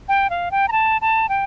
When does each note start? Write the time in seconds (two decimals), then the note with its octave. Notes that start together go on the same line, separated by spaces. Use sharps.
0.09 G5
0.30 F5
0.51 G5
0.68 A#5
0.72 A5
1.01 A5
1.29 G5